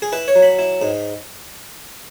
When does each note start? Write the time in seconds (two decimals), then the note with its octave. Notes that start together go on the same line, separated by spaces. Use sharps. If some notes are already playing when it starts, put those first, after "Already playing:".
0.02 G#4
0.12 E4 B4
0.28 C#5
0.35 F#3
0.43 B5
0.59 E4
0.82 G#2